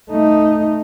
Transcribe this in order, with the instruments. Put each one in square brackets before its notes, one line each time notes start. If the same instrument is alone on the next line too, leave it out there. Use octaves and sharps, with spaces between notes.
[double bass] A3 D#4